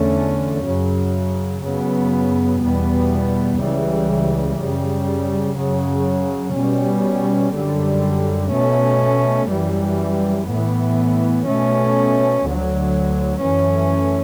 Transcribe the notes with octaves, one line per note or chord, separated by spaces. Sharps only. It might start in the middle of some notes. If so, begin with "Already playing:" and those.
Already playing: E2 D3 A3 C#4
F#2 C#3 F#3
F#2 C#3 F#3 B3
E2 B2 G3 B3
C#2 C#3 E3 G3
F#2 C#3 G3
F#2 C#3 F#3
B2 G3 C#4
F#2 D3 G3
B2 A3 C#4
F#2 E3 G3
A2 E3 B3
B2 A3 C#4
D2 D3 F#3
F#2 E3 A3 C#4